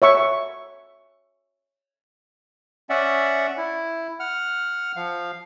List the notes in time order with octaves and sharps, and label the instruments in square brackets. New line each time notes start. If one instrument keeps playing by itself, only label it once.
[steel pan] C#5 E5 C#6
[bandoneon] C#4 D5 E5 F#5
E4
F#5 F6
F3 F5